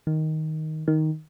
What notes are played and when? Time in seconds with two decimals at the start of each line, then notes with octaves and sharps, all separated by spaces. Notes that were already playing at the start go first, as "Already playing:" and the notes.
0.07 D#3
0.88 D#3